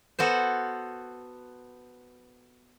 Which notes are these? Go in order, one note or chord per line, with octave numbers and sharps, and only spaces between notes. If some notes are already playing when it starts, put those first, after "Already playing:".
B3 F#4 A4 C5